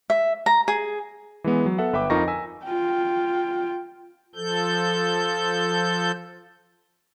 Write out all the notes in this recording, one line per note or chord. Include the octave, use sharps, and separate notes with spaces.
E5
A#5
G#4
E3 G#3 B3
F#3
B3 A4 E5 F#5
G1 B4 E5 G5 D6
F2 D#4 F4 A#4 C#6 A#6
G#5 E6 B6
F4 G5
F3 A4 G6